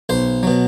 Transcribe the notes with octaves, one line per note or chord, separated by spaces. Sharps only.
B1 C5
B2 F#3